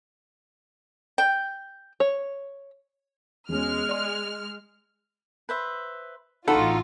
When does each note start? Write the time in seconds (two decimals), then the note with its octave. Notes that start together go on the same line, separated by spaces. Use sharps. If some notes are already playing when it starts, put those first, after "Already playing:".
1.18 G5
2.00 C#5
3.49 E1 G#3 C#4 F6
3.89 D5 C6
5.49 B4 C5 E5
6.48 A1 D#4 F4 F#4 A4 A5 B5